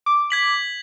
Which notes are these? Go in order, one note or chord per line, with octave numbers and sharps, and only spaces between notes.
D6
G#6 B6 F#7